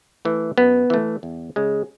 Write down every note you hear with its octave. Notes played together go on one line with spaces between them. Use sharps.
E3 A3
F#2 B3
E3 A3
E2
C#3 G#3